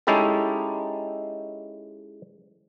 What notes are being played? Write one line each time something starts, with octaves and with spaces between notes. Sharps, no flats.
G#3 C#4 D#4 E4 G4 A4